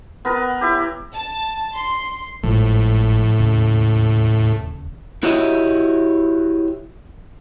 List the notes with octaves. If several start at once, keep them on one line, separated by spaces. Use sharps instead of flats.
B3 A#4 B4
E4 G4
A5
C6
G#1 A2 F3 G#3
E1 D#2 C#3
E4 F#4 G4 C#5 D#5 E5